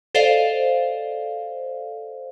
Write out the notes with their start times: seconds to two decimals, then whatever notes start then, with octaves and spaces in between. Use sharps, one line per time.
0.15 A4 C5 D5 D#5 F5